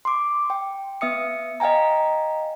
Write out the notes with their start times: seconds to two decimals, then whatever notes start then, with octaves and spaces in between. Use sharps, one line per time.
0.05 C6 D6
0.50 G5
1.01 B3 E5 D#6 C#7
1.60 D#5 F5 G5 G#5 A#5